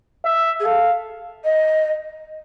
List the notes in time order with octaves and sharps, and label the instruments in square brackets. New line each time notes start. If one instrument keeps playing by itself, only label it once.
[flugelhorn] E5
[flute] G#4
[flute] A4 [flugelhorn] F5
[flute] D#5